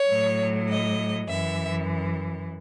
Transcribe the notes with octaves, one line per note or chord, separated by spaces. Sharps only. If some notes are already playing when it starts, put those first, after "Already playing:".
Already playing: C#5
A2 F#3
D#5
F#2 E3 E5